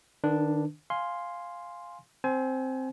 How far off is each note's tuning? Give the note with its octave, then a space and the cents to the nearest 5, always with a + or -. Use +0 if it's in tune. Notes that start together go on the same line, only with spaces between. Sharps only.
D#3 -30 D4 +0 B4 +0
F5 +0 G#5 +0 C6 +0
C4 +0 C5 +0 G#5 +30